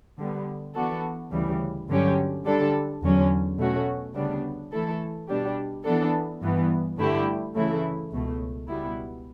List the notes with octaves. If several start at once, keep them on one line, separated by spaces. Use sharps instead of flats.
D3 G3 B3
E3 B3 D4 F#4 A4
D2 C#3 E3 G3
G2 D3 F#3 C#4 G4
D3 G3 D4 A4
E2 D3 F#3 C#4
B2 A3 C#4 F#4
D2 C#3 G3 B3 D4
E3 A3 E4 A4
B2 G3 D4 G4
E3 B3 D4 A4
G2 E3 B3
G2 D3 A3 E4 G4
C#3 E3 A3 E4
C#2 B2 A3
C#2 B2 G3 B3 E4